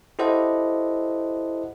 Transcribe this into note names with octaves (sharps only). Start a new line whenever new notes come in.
E4 G4 A4 C5 D#5 F#5